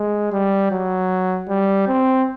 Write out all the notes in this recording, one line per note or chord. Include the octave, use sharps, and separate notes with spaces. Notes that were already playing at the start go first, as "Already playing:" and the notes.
Already playing: G#3
G3
F#3
G3
C4